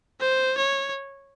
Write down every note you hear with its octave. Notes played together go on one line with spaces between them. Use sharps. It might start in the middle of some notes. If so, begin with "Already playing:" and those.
C5
C#5